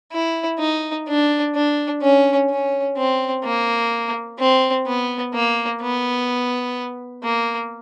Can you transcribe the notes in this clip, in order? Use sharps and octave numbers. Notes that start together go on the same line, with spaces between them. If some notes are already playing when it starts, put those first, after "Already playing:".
E4
D#4
D4
D4
C#4
C#4
C4
A#3
C4
B3
A#3
B3
A#3